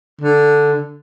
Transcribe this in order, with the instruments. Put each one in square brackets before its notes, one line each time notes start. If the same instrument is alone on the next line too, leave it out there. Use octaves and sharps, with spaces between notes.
[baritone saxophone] D3